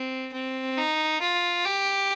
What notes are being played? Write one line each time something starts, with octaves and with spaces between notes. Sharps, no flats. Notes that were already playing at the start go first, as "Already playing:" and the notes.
Already playing: C4
C4
D#4
F4
G4